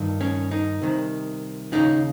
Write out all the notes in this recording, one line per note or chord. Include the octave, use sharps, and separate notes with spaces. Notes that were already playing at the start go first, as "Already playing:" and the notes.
Already playing: G2 D#3
C#4
D#4
C2 C3 D#3
D#2 C#3 D#4